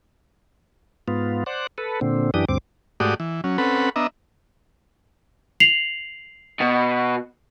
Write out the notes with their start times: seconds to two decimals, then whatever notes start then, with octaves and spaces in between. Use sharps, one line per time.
1.08 G#2 B3 F4
1.46 C5 D5 F#5
1.78 A4 B4
2.01 A#2 D3 C4
2.34 F#2 E3 D4 G4 D#6
2.49 D2 G2 C4 D6
3.00 G#2 A3 F#4 G4 D5 D#6
3.20 E3
3.44 F#3 C#4
3.58 C4 C#4 A4 B4 F#5 B5
3.96 B3 D4 D#5 E5 A#5
5.60 C7 F7 F#7
6.60 B2